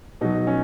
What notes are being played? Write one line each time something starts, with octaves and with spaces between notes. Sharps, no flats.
B2 F#3 D#4
C#4